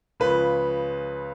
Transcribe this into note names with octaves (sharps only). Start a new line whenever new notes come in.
C#2 C#3 F3 B4